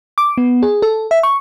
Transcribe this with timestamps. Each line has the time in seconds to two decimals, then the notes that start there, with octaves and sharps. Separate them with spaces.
0.18 D6
0.38 B3
0.63 G#4
0.82 A4
1.11 E5
1.23 C#6